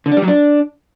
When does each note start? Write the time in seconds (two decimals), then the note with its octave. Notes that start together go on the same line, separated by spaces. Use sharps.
0.06 D3
0.11 D4
0.17 G3
0.22 F#3
0.28 D4